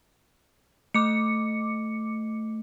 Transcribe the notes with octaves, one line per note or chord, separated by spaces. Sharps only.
A3 D6 C#7